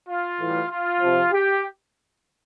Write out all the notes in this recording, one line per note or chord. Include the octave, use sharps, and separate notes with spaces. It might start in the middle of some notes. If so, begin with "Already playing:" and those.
F4
A2 E3 G3
F4
C3 F3
G4